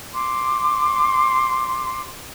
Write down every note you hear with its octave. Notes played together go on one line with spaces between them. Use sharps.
C6 D6